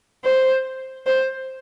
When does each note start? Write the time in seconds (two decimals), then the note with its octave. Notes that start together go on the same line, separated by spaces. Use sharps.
0.25 C5
1.06 C5